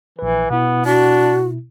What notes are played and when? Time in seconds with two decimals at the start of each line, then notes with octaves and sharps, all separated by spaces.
0.19 A#1 E3 B4
0.50 B2 B3 E4
0.85 D4 F#4